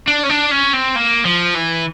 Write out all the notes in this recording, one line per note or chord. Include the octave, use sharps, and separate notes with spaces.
D4
C#4
D4
C#4
C4
A#3
F3
E3